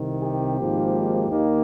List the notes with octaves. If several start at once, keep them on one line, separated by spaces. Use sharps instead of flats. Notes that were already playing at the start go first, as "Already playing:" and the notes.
Already playing: C2 C3 D#3
G4
G#1 G#2 F3 A#3
D#2 D#3 A#3